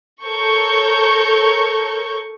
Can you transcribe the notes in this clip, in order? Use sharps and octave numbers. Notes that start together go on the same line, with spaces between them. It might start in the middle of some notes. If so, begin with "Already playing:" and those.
A4 A#4 C#5 C#6 G6